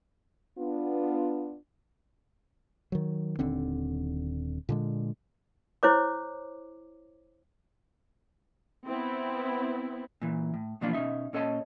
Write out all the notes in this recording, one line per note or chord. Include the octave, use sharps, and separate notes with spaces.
B3 D4 F4
D#3 F#3
D#1 D#2 D3 C4
A#2 D3 G#3
E4 C5 C#5 D6
B3 C4 E4
A#2 E3
A2
B2 E3 F3 A#3 D4 F4
B2 C#4 D#4 E5
A#2 C#4 A4 C#5 D#5 A5